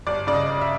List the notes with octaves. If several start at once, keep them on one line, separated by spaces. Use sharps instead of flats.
G1 D5
C#3 D5
D#5
G1
E5